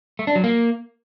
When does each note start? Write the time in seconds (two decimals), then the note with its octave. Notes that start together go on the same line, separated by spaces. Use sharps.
0.19 A3
0.27 D4
0.36 F#3
0.44 A#3